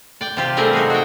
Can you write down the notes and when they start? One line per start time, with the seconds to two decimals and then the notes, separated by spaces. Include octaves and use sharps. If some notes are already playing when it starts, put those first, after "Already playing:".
0.21 D5 G5
0.37 C3 F4 G4
0.57 G3 A3 C4 G#4 A#4
0.73 D#4 F#4 G#4
0.90 F#4 A#4 G5